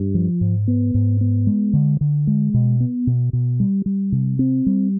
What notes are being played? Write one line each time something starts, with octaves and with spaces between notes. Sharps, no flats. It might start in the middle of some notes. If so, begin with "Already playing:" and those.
Already playing: G2
F3
G#2
B3
G#2
B3
G#3
D3
D3
G#3
B2
B3
B2
B2
G3
G3
C3
C4
G3